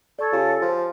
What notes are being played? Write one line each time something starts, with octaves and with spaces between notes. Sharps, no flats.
A4 D5 C#6 G#6
C#3 F4 G4 G#5
F3